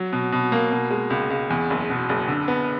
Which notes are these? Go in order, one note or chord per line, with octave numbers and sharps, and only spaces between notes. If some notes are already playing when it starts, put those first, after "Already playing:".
Already playing: F#3
B2
B2
A#3
B2
G#3
C#2
C#2
E2
F#1
B2
F#1
D3
B3